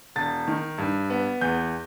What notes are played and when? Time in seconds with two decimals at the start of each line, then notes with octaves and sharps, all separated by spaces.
0.16 E1 A6
0.47 D#3
0.78 G2
1.10 B3
1.41 E2 G6